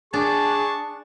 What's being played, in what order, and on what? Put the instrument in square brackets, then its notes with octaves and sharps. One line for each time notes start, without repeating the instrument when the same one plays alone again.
[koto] D4 [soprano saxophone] G#4 [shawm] A5 [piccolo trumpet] C#6